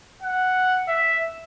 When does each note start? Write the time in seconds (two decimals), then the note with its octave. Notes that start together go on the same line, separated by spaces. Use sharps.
0.23 F#5
0.88 E5